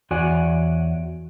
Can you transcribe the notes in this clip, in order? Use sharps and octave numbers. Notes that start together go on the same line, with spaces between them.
E2 F#4 C#5 D5 F#5 G#5